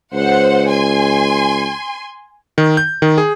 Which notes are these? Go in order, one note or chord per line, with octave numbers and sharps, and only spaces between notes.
C#2 C5 F#5
G#5 C6
D#3
G6
D#3
G#4